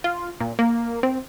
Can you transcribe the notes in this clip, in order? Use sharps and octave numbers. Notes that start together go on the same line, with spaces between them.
F4
A#2
A#3
C4